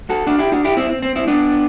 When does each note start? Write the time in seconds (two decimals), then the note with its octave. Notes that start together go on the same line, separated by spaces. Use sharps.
0.09 F#4 A4
0.27 D4 F#4
0.39 E4 G4
0.52 D4 F#4
0.64 E4 G4
0.77 C4 E4
0.90 C4
1.02 C4
1.15 C4 E4
1.28 B3 D4